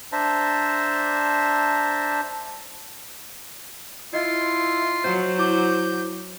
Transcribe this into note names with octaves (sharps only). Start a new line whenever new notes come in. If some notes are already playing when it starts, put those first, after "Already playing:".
D4 C5 E5 A5 A#5
E4 F4 D#5 C6
F#3 C5
E4 D6 G6 G7